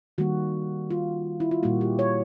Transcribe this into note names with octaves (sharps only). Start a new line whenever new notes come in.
D#3 G3 A#3 F#4
F4
E4
F4
A#2 G3 A#3 F#4
G4
C#5